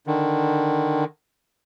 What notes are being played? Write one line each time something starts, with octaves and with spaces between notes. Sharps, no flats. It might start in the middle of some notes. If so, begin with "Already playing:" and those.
D3 D#3